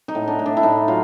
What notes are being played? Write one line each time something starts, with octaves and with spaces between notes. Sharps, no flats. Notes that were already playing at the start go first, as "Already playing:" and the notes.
D#4
A2
D4
A2
D4
E4
A2 D#4
F#3 F4